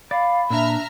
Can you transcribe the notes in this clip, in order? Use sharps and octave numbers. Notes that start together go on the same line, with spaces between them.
D5 F5 B5
A#2 D4 E5 A#5 F6